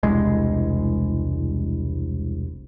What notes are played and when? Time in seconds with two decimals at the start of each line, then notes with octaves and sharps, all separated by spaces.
0.03 E1 C2 G#3